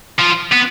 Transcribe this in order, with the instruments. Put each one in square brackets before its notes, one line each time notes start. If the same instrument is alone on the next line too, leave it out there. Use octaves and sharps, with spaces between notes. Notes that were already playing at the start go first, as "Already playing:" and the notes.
[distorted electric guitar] F3
B3